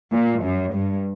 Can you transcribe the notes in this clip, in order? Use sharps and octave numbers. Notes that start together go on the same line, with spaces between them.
A#2
F#2
G2